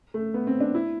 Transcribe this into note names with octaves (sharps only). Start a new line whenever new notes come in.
A3
B3
C4
D4
E4